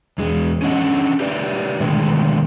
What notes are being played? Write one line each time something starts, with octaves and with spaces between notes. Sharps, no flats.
E2 G#3
C#4 D4 A4 D#5 F#5
G4 B4 D5 E5
B2 D3 D#3 G#3 A3